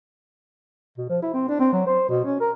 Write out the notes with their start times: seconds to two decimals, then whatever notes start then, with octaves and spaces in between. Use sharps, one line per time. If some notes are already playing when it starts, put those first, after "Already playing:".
0.98 B2
1.09 F3
1.22 E4
1.34 C4
1.49 D4
1.60 C4
1.73 F#3
1.87 C5
2.09 B2
2.24 C#4
2.40 A#4